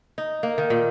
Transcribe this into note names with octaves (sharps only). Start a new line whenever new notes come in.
D#4
A#3
D#3
A#2